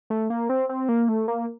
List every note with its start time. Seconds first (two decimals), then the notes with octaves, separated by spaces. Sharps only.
0.10 A3
0.30 A#3
0.49 C4
0.69 C4
0.89 A#3
1.09 A3
1.28 A#3